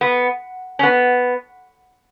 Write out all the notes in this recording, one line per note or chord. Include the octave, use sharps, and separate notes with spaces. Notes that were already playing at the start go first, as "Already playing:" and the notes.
B3
C#4
B3